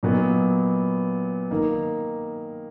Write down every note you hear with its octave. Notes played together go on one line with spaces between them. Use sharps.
A#2 F#3 B3 D#4
D#3 A#3 D#4